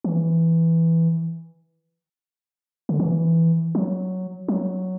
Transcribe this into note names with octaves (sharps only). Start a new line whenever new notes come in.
E3
D3
E3
F#3
F#3